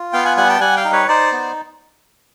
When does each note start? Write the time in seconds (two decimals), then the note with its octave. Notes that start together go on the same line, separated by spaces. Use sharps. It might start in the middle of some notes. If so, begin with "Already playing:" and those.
Already playing: F4
0.13 B3 F5 G5
0.25 F#5 G#5
0.37 G3 F#5 G#5
0.49 G5 A5
0.60 G3 F#5 G#5
0.76 F5 G5
0.85 D#4
0.92 B4 C#5
1.08 D#4 C5 D5
1.32 B3